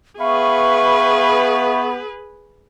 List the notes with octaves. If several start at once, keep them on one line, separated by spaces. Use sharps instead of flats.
B3 G#4 B4 E5 F5 B5 C#6